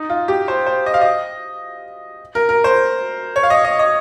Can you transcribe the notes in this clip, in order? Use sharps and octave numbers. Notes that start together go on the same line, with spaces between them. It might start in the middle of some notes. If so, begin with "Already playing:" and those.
Already playing: D#4
F4
G4
C5
C5
D#5
F5
D#5
A#4
A#4
C5
C#5
F5
D#5
D#5
D#5